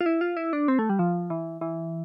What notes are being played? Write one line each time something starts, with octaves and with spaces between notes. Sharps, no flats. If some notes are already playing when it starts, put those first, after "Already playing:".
F4
E4
F4
E4
D4
C4
A3
G3
F3
E3
E3